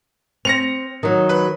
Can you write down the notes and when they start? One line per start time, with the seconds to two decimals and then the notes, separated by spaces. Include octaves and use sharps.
0.45 C4 A#6 C#7 F7
1.03 D#3 F#3
1.29 B4